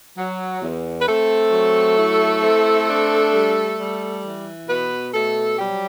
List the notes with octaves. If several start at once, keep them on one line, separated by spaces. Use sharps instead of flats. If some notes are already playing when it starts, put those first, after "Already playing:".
F#3
E2
B4
A3 C4 A4
F#3
E4
C4
D4
G3
G3
E3
B2 B3 B4
B2 A3 A4
F#3 G3 G4